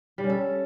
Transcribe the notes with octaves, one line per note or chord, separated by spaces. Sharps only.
G3
C#4
A4